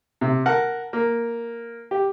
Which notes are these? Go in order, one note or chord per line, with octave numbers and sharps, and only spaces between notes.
C3
A#4 F#5 A5
A#3
G4